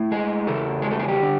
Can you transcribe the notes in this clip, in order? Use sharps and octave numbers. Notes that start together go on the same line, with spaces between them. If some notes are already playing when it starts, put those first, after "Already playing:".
Already playing: A2
G#3 G#4
E2 C#3 A4
G#3 G#4
A3 A4
G#3 G#4
G3 G4
D3